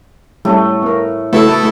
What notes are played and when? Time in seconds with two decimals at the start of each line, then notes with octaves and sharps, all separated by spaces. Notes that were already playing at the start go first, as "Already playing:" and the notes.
0.45 A2 G3 A3 C#4
0.83 B3 A#4
1.33 C#3 A3 B3 E4 F#4 A4